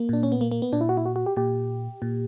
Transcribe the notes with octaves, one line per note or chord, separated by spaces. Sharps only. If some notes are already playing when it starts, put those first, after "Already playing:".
Already playing: A#3
A#2 D4
C#4
B3
A#3
A#3
B3
A#2 D4
E4
F#4
E4
F#4
F#4
G4
A#2 G4
A#2